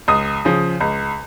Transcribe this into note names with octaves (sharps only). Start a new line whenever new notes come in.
C#2 D#6
C#3 F3
C#2